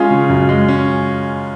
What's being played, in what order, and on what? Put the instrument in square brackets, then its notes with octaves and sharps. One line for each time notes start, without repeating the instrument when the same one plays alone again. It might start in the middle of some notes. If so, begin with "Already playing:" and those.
Already playing: [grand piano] G#3 C#4 [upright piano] F4 G#4
[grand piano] C#3
F#2
G#3
C#4